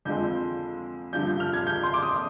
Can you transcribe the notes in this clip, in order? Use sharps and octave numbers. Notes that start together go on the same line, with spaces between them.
F2 D3 F3 G#3 C4 G6
G2 D3 F3 G6
G6
F6
G#6
G6
C6
D6
D#6